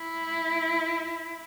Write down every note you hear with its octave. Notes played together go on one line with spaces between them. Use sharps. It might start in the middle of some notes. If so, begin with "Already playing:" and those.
Already playing: E4